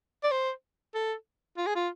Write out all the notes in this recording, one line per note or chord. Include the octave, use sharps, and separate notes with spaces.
D5
C5
A4
F4
G#4
F4